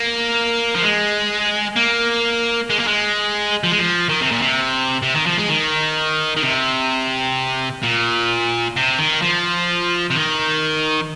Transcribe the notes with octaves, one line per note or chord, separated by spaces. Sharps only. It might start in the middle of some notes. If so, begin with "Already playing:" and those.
Already playing: A#3
F3
G#3
A#3
G#3
A#3
G#3
F3
G#3
F3
D#3
C3
A#2
C3
C3
D#3
F3
G#3
D#3
D#3
C3
A#2
C3
D#3
F3
C3
D#3